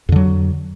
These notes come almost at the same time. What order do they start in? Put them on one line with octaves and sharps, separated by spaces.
F2 D3 F#3